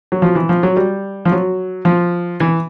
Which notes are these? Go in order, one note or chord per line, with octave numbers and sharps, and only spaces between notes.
F#3
F3
E3
F3
F#3
G3
F3
F#3
F3
E3